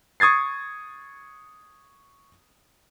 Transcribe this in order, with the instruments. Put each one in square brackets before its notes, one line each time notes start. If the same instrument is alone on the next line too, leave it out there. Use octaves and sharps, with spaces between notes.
[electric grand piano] C#6 D#6 G#6 A6 C7